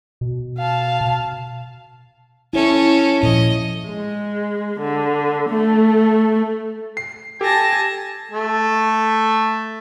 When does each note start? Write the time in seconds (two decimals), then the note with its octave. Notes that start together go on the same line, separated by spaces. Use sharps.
0.21 B2
0.58 F5 A5
1.01 B2
2.53 C#4 E4 A4 C#5
3.23 A#2 F3 D#5
3.89 G#3
4.80 D3
5.50 A3
6.97 C7
7.41 G4 A4 G#5 A5 A#6
8.32 A3